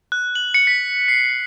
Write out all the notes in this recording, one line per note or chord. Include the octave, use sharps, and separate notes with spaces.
F#6
F#7
C#7
B6
C7